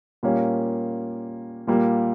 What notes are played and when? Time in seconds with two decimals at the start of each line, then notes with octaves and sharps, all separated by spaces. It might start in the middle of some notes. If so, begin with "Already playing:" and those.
0.23 A#2 G3 A#3 C#4
1.67 A#2 G3 A#3